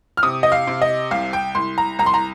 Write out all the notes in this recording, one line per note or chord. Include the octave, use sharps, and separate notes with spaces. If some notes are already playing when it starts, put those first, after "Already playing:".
F6
C3 D#6
D#5
F5
C3
D#5
C2 F5
G5
C2 C6
A#5
C2 A#5
C6
A#5